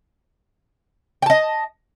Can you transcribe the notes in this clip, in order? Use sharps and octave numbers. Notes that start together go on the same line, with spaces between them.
D#5 G5 A5